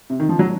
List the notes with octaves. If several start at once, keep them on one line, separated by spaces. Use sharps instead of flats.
C3
D#3
F3
F#3